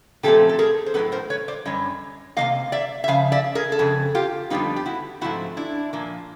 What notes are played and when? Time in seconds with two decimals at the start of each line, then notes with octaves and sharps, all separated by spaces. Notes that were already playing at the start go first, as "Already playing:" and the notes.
0.23 A#2 F3 A3 C4 G4 A4
0.49 A4
0.59 G#4 A#4
0.86 C5
0.94 A2 F#3 B3 A4 B4
1.12 A#4 C5
1.30 B4 C#5
1.48 C5 D5
1.65 F#2 D3 G3 C#5 D#5
2.37 C3 F3 A#3 D#5 F5
2.72 D5 E5
3.04 E5
3.08 C#3 F3 F5
3.32 D5 E5
3.55 G#4 A#4
3.72 A4
3.79 F2 C#3 G#4
4.15 F4 G4
4.50 F2 D3 G3 B3 D#4 F4
4.76 G4
4.86 E4 F#4
5.21 G#2 F3 A3 C4 E4 F#4
5.57 D4 E4
5.93 A#2 F3 A#3